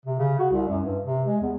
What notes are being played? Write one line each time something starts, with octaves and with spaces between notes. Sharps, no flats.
C3
C#3
F#4
C2
F#2
G2
C3
G#3
E2